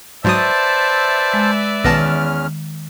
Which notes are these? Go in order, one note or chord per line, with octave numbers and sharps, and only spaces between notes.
G#2 F#3 B4 C5 D5 E5 A5 D#6
G#3
B1 E2 D#3 B3 C#4 A5 F6 A#6